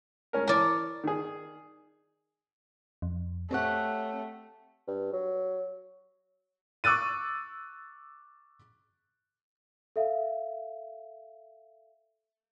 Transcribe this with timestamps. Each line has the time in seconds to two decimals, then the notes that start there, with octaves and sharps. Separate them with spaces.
0.33 G#3 C#4 A#4
0.47 E3 A#4 C#5 D5 A5
1.04 D#3 G#4
3.02 F2
3.51 A3 C4 G4 C#5 F#5
4.88 G2
5.13 F#3
6.84 C#6 D6 E6 F#6 A6 D#7
9.96 A4 E5 F5